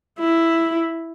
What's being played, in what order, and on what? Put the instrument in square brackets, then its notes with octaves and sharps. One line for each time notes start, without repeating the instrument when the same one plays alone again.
[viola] E4